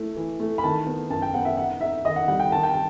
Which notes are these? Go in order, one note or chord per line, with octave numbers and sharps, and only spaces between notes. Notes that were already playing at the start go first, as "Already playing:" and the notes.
Already playing: A3 E4
E3
A3
B5
D#3 A5
B3
F#2 A5
G5
B3 F#5
E5
D#4 F#5
D#4 E5
D#3 D#5
F#5
G3 F#5
G5
D#3 A5
G5
A5